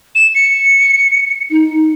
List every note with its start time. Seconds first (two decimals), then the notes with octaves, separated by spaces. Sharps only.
0.15 E7
0.35 C#7
1.51 D#4